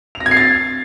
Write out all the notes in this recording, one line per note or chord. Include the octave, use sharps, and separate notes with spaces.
F7
A#6
G#6
C7
A6